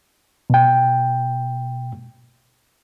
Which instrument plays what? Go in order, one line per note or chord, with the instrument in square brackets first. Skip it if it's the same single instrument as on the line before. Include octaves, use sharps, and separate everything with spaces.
[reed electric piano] B2 G5